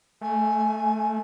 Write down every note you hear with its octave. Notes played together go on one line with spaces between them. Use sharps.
A3 G#5